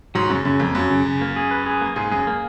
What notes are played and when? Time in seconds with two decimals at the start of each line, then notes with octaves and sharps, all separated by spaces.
0.15 G#2 F#3
0.30 F#2 C#3
0.45 F#2 C#3
0.60 F2 A#3
0.75 F#2 F#3
0.90 C#3
1.05 C#3
1.21 A#3
1.36 G#4
1.51 B4
1.66 G#4
1.81 A#3
1.96 G#2 G#4
2.12 F#2 G#4
2.27 A#3